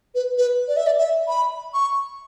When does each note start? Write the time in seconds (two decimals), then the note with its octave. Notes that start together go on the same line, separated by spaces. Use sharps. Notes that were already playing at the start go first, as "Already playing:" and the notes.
0.15 B4
0.37 B4
0.68 D5
0.77 E5
0.87 D5
0.98 E5
1.28 B5
1.74 C#6